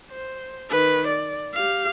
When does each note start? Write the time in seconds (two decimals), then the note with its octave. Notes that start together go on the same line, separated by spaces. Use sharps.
0.10 C5
0.70 D#3 B4
1.07 D5
1.54 G4 F5